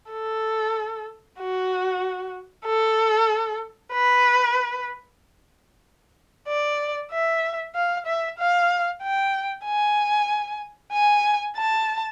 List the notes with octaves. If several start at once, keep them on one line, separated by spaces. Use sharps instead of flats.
A4
F#4
A4
B4
D5
E5
F5
E5
F5
G5
G#5
G#5
A5